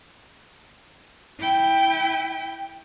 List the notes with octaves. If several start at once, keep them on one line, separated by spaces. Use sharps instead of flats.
E4 G5